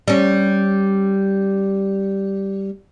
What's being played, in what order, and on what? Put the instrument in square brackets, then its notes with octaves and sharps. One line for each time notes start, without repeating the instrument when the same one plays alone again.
[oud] G3 C#4